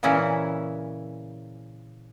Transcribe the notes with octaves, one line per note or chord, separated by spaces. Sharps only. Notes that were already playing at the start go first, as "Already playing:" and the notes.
A#2 C#3 E3 C#4 E4